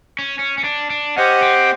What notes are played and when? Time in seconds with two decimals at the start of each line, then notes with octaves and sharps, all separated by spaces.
0.19 C#4
0.39 C#4
0.58 C#4
0.64 D4
0.90 D4
1.17 C#4 G4 C5 D#5 F#5
1.42 C4